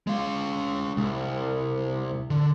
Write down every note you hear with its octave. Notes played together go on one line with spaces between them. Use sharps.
G#3 F5
C2
D3